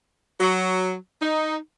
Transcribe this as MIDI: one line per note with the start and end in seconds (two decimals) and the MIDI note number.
0.40 0.94 54
1.21 1.56 63